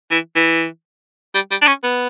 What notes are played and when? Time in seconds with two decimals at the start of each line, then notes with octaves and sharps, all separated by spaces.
0.11 E3
0.35 E3
1.34 G3
1.51 G3
1.61 D4
1.67 C#4
1.83 B3